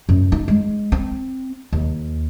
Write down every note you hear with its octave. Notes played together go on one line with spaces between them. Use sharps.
F#2
D#4
G#3
C4
D#2